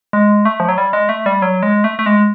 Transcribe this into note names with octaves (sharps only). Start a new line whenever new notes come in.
G#3
A3
F3
F#3
G3
G#3
A3
G3
F#3
G#3
A3
A3
G#3